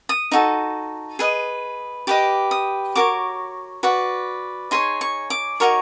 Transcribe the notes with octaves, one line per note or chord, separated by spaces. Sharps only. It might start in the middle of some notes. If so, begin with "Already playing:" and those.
D#6
D#4 F#4 A4
G#4 B4 D#5
G4 B4 D#5 D6
D#6
F#4 A#4 C#5 D6
F#4 B4 D5
D#4 G#4 C#5 C6
C#6
D6
D#4 F#4 A#4 C#5